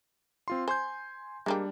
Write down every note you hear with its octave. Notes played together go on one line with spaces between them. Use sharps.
C4 F4 C6
C5 G#5 C6 G6
G3 G#3 A#3 D4 G4